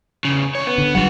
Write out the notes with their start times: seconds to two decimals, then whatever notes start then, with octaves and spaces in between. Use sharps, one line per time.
0.25 E2 C#3
0.55 C2 C#5
0.66 B3
0.78 D3
0.95 G1 F#3 G3 F4 F#5